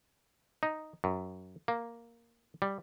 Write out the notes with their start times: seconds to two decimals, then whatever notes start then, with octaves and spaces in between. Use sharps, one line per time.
0.63 D#4
1.04 F#2
1.68 A#3
2.62 G3